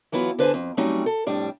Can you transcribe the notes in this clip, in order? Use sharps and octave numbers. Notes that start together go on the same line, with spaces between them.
E3 F#3 B3 E4 F4
D3 B4 C5 G#5 A5
F2
F#3 G3 A3 C4 C#4 D#4
A4
F2 A2 G3 D4